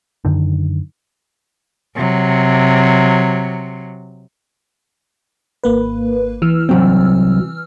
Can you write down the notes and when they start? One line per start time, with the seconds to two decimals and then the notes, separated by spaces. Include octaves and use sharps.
0.25 F#2 D3 D#3
1.96 C3 F#3
5.64 G#1 A#3 B4
6.42 E3 E6 F6
6.69 C2 F#3 C4